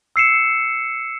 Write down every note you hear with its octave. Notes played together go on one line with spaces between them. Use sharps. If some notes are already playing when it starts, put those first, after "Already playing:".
E6 C7 C#7 E7